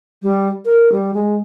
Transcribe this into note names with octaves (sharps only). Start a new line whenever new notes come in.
G3
A#4
G3
G#3